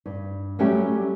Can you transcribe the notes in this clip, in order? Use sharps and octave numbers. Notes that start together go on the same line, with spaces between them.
G2
F#3 G3 A3 C#4 G4